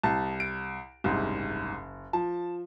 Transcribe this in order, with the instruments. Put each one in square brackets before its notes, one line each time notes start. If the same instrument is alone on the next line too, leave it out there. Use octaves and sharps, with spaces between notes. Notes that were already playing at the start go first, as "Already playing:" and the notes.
[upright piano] C2 [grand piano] A5
[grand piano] D7
[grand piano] F#1 [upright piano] C2 G#2
[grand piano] F3 [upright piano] A5